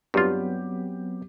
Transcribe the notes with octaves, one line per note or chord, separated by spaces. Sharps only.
G2 F#3 B3 C4 F4 G4